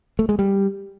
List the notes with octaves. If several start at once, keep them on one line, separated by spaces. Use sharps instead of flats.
A3
G#3
G3